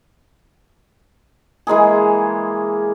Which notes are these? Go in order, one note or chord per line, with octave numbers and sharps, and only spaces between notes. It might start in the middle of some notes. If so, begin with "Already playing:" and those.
E3 G#3 A#3 G#4